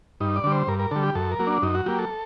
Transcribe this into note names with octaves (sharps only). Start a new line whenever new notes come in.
G2 D#4
D5
D3 G3
C5
G2 A#4
A#4
D3 G3 A4
G4
F#2 A4
A#4
F#3 A#3
D4
F#2 D#4
F#4
F#3 A#3 G4
A4